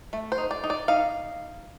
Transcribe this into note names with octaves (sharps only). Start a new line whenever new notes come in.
A3
C5
D#4
D5
D#4
D5
D#4 F5